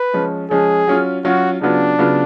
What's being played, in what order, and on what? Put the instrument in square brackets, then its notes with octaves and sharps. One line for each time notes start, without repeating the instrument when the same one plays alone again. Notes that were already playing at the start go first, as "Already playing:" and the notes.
Already playing: [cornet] B4
[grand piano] F3 G#3 C#4
[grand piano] F3 G#3 C#4 [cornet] G#4
[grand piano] F#3 C#4 F4
[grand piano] F#3 C#4 F4 [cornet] F#4
[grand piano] C#3 F#3 B3 F4 [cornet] D4
[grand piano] C#3 F#3 B3 F4